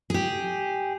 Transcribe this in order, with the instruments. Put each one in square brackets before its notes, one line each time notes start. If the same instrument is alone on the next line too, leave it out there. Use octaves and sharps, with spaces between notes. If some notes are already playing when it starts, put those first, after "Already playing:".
[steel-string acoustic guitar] G4 G#4